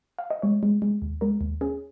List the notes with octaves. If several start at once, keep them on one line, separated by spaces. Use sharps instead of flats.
F5
D#5
G#3 C#5
G#3
G#3
D#2
G#3 A#4
D#2
C#4 G#4